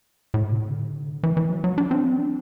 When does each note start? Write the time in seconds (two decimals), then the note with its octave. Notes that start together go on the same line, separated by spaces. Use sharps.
0.34 A2
0.52 C3
0.69 D3
1.23 E3
1.37 E3
1.50 F#3
1.64 F#3
1.78 D4
1.91 C4
2.04 D4
2.19 C4